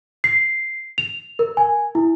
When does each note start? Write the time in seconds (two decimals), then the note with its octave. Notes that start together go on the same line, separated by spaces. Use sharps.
0.24 C7
0.98 F7
1.39 A#4
1.57 G#5
1.95 E4